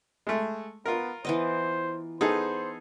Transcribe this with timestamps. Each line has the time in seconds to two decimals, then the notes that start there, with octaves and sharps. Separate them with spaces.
0.27 G#3 A3
0.86 B3 F4 A#4
1.25 E3 B3 C5 D#5
2.21 B3 D#4 G#4 A4 C5